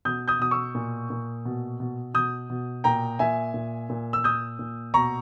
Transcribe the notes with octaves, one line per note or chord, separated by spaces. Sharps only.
B2 D#6 G6
D#6 G6
B2 D#6
C#6 E6
A#2
A#2
B2
B2
B2 D#6 G6
B2
A#2 G5 A#5
A#2 E5 G#5
A#2
A#2
E6
A#2 D#6 G6
A#2
B2 A#5 C#6